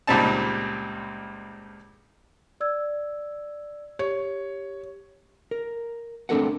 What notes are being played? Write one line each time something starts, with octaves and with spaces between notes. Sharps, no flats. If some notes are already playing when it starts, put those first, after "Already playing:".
C#2 A#2 G3 C4 D#4 A5
D5 E6 G#6
G4 C#5
A#4
A3 C4 D4 A4 A#4 F#5